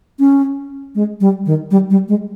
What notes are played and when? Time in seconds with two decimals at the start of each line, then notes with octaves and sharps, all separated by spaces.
0.19 C#4
0.95 G#3
1.21 G3
1.46 D#3
1.71 G3
1.91 G3
2.08 G#3